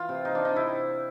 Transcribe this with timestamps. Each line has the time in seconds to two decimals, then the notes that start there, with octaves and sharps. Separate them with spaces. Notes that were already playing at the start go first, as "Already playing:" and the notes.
Already playing: E3 F4
0.09 C3
0.25 D#4
0.35 D4
0.45 D#4
0.56 C3 E4